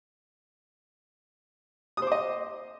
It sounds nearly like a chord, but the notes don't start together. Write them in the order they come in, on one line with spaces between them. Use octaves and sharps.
D#6 C5 D6 D#5